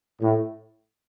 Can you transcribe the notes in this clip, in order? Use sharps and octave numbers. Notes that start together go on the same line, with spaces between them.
A2